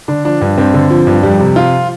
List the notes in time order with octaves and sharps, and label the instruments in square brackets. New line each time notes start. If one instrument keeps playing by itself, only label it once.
[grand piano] D3 D4
F3 D4
G2
G2 C4
D3
F3
G2
F2 G3
C3
F3 F4